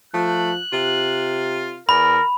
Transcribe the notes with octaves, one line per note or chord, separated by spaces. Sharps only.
F3 A3 F#6
C3 F4
E2 A#4 B5